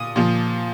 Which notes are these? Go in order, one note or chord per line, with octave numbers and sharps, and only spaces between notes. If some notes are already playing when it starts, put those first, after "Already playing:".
Already playing: A#2 D#6
A#2 F3